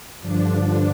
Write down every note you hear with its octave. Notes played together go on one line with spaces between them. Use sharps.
G2 D3 F3 D4